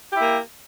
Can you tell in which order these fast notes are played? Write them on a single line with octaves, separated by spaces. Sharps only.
G4 E4 A#3